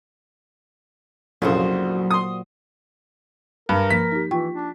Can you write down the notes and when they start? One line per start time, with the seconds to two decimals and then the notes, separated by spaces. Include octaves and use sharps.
1.42 C2 F2 A#2 C#3 F#3 F#4 C5
2.11 C6 D#6
3.69 G2 A#4
3.90 F3 A#3 B6
4.12 D#4 G4
4.31 E3 F4 G5 C#6
4.54 D4